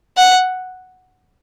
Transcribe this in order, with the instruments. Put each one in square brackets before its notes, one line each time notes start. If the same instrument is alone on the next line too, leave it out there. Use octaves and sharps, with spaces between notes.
[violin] F#5